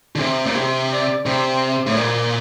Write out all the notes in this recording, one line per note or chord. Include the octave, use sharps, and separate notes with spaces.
D3
C3 C5
A#2
C3
D5
C3 C5
A2
A#2 D5